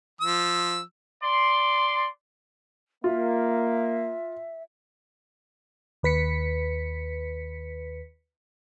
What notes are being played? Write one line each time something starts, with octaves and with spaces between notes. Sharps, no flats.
F3 E6
D5 C6
A#3 F4 E5
D#2 B4 B6 C#7